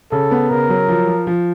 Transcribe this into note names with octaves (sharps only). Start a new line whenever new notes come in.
C#3 A4
B3
C#3 A#4
F#3
F3
F3
F3